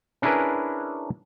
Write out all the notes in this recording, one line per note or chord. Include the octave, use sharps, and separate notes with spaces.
C#4 D4 E4 G#4 A#4 B4